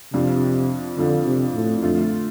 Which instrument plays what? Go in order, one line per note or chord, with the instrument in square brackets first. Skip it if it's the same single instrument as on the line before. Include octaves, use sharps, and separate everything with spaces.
[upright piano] F2 F3 D4 [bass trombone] C3
[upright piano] F2 F3 D4 [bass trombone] D3
[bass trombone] C3
A2
[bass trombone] F2 [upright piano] D3 A3 F4